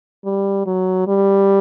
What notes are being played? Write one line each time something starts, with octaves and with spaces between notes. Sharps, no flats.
G3
F#3
G3